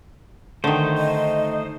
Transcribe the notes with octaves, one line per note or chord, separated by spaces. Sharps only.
D3 D#3 A3 D#4 C5
D#5